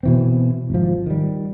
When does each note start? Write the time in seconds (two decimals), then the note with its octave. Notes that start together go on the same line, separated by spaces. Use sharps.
0.03 B2 E3 C4
0.70 G#1 F3
1.07 D#3 G3